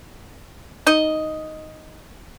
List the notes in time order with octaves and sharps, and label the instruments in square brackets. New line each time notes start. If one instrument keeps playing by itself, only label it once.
[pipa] D#4 D#5